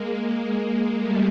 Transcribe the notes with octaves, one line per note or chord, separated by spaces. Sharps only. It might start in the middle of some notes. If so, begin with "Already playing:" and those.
Already playing: G#3 A#3
G#3 A#3
G3 A3